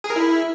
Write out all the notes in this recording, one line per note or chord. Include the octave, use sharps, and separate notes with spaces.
G#4
A#4
E4